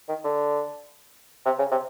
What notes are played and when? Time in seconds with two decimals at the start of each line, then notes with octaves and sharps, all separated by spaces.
0.08 D#3
0.24 D3
1.45 C3
1.59 C#3
1.71 C3